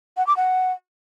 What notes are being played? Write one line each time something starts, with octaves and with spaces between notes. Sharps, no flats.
F#5
D6
F#5